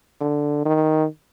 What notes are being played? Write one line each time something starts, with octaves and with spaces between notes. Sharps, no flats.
D3
D#3